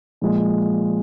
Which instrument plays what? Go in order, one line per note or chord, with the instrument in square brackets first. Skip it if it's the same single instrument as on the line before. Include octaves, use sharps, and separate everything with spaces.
[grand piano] A#2 F3 G#3